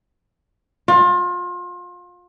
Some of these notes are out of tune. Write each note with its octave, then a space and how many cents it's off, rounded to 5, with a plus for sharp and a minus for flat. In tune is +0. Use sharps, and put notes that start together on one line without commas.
F4 +30